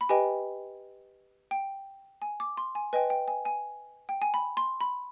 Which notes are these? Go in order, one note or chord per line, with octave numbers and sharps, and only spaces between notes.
B5
G4 B4 D#5 G5 G#5
G5
G#5
D6
C6
G#5
B4 D#5 G5 G#5
G5
G#5
G#5
G5
G#5
B5
C6
B5